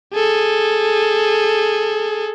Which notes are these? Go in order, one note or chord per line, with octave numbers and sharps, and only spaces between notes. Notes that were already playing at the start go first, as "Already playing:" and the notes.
G#4 A4